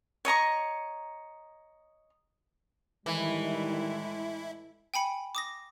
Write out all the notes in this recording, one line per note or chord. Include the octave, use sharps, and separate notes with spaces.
C#5 D#5 A#5 C#6
A2 D#3 E3 G3 G#3 E4
G5 G#5 B5 C#7
D6 D#6 A#6